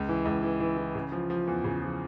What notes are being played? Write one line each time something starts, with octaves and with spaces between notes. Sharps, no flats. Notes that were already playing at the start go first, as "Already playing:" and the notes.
Already playing: C#2
E3
C#2
E3
E3
E3
C#3
F3
F3
E2
C#3
F3